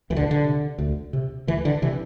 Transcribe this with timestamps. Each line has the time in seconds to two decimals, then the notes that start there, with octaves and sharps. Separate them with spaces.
0.10 D2 E3
0.17 D3
0.31 D3
0.45 C3
0.78 D2
1.13 C3
1.47 D2 E3
1.65 D3
1.82 C3 E3